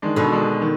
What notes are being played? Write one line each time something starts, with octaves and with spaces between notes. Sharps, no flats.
D#3 G#3 D4
B2 D3
D#3 G#3 D4
D#3